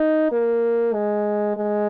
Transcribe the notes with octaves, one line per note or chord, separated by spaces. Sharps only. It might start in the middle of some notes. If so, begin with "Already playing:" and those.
Already playing: D#4
A#3
G#3
G#3